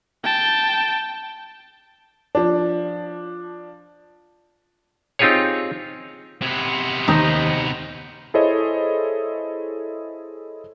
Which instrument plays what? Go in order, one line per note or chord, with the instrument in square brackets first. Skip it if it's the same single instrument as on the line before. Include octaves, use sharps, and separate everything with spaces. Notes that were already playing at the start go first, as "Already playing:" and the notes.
[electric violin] G5 A5
[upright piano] F3 D4
[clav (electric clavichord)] C4 D#4 F4 G4 G#4 C#5
[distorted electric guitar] C3 B3 [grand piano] G#6
[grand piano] D#2 [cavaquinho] D#4 C5 D#6
[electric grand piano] E4 G#4 A4 C5 C#5 D#5